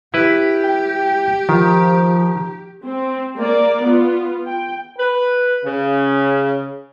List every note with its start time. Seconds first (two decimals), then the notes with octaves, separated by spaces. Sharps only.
0.14 E4 G4 B4
0.64 G5
1.49 D#3 F3
2.85 C4
3.38 A#3 A#4 D5
3.83 B3 F4
4.46 G5
4.97 B4
5.64 C#3